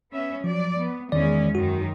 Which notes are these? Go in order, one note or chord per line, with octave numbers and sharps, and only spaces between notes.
B3 C#4 E5
F3 F#3 D5
B3
E2 D#3 G#3 C#4 D5
F#2 D#3 F#4